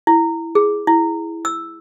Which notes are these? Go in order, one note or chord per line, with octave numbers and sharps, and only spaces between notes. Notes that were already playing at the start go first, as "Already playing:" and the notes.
E4
G#4
E4
E6